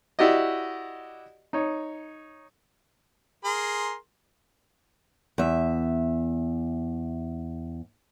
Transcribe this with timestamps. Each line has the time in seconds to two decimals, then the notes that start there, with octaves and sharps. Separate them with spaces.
0.19 E4 F#4 G4 D5 D#5
1.53 D#4 C#5
3.45 G#4 A#4 C6
5.38 E2 E5